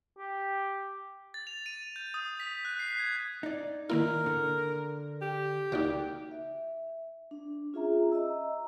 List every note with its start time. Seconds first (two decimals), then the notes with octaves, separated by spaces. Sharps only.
0.18 G4
1.34 A6
1.47 F7
1.66 D#7
1.96 G6
2.14 D#6
2.40 B6
2.65 F#6
2.79 C7
2.99 G#6
3.43 D#4 D5
3.90 D#3 A#3 E4 A#4
4.26 D3
5.22 G4
5.72 C#2 A#3 D#4 F#4 D5
6.31 E5
7.31 D4
7.73 C#4 F4 G#4 E5 A#5
8.12 D#5 E5 A#5 E6